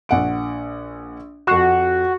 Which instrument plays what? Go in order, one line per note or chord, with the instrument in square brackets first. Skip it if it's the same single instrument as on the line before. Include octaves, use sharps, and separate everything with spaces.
[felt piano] A#1 F#5 D7
[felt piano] F2 C7 E7 [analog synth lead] F#4